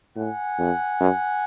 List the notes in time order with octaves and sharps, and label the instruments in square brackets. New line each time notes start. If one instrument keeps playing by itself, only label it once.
[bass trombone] A2 [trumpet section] F#5 G#5
[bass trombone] F2
F#2